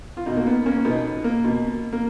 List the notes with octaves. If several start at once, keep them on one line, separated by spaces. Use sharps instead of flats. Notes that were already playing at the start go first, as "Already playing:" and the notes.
F4
B2 D#4 F#4
A#3
B3
A#3 C#4
B2 B3 D#4
A#3
B2
A#3